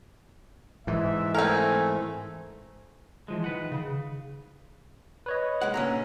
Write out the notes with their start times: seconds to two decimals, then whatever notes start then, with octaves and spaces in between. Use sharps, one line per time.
0.87 G#2 E3 E5
1.35 A3 C4 A#4 G#5
3.28 E3 F3 G#3
3.44 D#3 B4 F#5
3.71 C#3
5.26 B4 C#5 D#5
5.61 G#3 F#5
5.74 A#2 D3 C#4 A#5